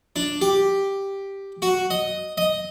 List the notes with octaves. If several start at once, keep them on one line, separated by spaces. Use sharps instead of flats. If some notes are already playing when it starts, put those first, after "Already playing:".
D4
G4
F#4
D#5
D#5